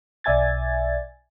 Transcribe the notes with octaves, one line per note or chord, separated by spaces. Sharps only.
B1 D5 E5 G#5 G#6 A6